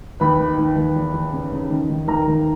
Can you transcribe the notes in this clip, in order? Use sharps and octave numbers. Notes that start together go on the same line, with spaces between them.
D#2 B4 B5
D#3
D#3
D#2
E2
E2
C#3
C#3
D#3
D#3
D#2 A#4 A#5
D#2